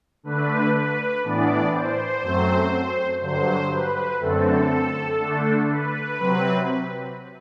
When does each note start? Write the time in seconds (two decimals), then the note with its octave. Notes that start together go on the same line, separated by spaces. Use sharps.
0.23 D3 A3 D4 B4
0.74 B4
1.23 A2 E3 B3 D4 D5
1.73 C5
2.22 F#2 F#3 A3 C4
3.21 G2 D3 F#3 C5
3.70 B4
4.20 F#2 D3 A3 C4 A4
5.19 D3 A3 D4
5.68 B4
6.19 C3 F#3 C4